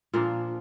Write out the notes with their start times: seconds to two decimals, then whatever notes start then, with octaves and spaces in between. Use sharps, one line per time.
0.13 A#2 F3 A#3 D4 F4